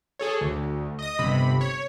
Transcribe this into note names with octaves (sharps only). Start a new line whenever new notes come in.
G#4 A4 C#5
D2
D#5 D#6
G1 C3 B5
C#5